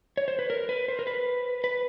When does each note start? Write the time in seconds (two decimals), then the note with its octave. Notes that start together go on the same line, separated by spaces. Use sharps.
0.17 C#5
0.28 C5
0.39 B4
0.50 A#4
0.69 B4
0.88 C5
0.99 A#4
1.07 B4
1.64 B4